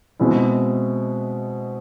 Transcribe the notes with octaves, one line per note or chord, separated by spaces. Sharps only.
B2 G#3 C4 E4